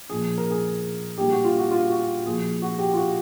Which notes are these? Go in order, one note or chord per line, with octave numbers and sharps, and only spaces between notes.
A#2 F3 G#4
A#4
G#4
A#2 G3 G4
F#4
F4
F#4
F4
F#4
A#2 F3 G#4
F#4
G4
F4
F#4